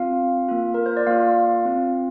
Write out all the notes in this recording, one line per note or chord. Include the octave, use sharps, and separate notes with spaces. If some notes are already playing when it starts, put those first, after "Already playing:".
Already playing: C4 F4 F5
A#3 F4
A#4
C5
D5
A#3 F4 F5
C4 F4